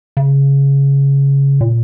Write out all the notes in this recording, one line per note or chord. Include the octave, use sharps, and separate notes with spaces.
C#3
A#2